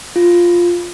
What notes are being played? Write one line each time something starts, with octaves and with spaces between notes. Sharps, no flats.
F4